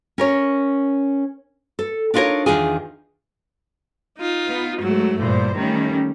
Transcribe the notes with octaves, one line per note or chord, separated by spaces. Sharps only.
C#4 A#4 C#5
A4
D4 D#4 F4 F#4 A#4 C#5
E2 G2 D#3 D4 F4 G#4
D#4 F4
B3
G#2 F#3 A3
G2 A#2 E3 C5
D#3 G3 A3 C#4